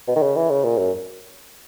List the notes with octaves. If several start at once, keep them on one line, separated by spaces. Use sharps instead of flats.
B2
D#3
C#3
E3
C#3
A#2
F#2